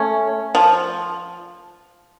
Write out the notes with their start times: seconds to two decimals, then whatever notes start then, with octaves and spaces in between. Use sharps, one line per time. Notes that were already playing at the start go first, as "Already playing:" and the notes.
Already playing: A3 C#4
0.55 F3